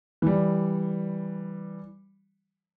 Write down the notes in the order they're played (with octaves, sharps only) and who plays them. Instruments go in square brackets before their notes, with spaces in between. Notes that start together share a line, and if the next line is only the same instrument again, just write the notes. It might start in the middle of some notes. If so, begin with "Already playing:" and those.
[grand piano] E3 G3